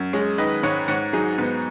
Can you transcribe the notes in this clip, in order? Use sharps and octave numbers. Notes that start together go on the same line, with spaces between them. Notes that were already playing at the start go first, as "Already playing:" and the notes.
Already playing: F#2
G#3 G#4 C#5
D#3 B4 D#5
G#2 C#5 F#5
G#2 C#5 F#5
F#3 D#4 G#4
G#2 B3